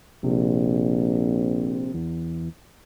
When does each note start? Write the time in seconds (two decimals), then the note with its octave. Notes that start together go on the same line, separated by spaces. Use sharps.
0.24 A#1 C3
1.94 E2